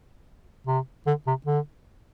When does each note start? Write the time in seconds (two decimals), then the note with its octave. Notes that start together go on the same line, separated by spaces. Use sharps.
0.67 C3
1.07 D3
1.27 C3
1.46 D3